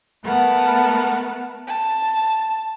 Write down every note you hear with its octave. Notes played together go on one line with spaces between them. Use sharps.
A3 B3 A#4 F#5 A5
A5